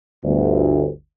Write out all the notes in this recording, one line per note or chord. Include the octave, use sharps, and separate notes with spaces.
G1 D2